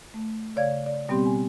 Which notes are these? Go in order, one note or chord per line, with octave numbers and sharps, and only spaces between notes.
A3
C#3 C#5 D5 F5 G#6
D5
B2 G3 B3 C4 G4 C6
G#5